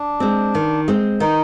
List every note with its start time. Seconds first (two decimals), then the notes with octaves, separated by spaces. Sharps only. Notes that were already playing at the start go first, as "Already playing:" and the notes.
Already playing: D4
0.20 G#3 C4
0.55 D#3
0.88 G#3 C4
1.20 D#3 D#4